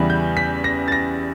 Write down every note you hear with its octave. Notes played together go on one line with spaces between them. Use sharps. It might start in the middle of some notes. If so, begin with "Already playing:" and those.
Already playing: E2 C#3 E3 G3 B3
G6
B6
A#6
A6
A#6